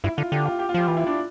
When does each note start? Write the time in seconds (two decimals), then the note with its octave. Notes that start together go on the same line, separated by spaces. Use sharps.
0.04 G2 E4
0.17 D3 F4
0.32 D3 G4
0.45 F4
0.59 G4
0.69 F4
0.74 F3 G4
0.88 E3 F4
0.97 E4
1.07 D4